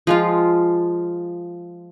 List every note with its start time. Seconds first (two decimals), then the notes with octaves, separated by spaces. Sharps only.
0.07 F3 G#3 F4